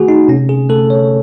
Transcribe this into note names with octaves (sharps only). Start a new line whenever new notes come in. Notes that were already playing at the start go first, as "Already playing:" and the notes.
Already playing: D#3 A3 F#4 G#4
D#4
C3 C#4
G#4
A3 A4
C#5